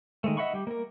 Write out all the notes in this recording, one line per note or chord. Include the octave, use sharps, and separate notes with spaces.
D#3 G#3 A3
D#5 E5 F#5 B5 C#6
G3 G4
A#3 A#4